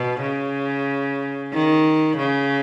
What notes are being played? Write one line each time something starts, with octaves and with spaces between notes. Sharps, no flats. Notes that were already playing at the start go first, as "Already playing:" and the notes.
Already playing: B2
C#3
D#3
C#3